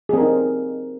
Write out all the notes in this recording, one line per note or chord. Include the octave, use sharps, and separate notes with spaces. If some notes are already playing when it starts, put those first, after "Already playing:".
C4 D#4 G#4 A#4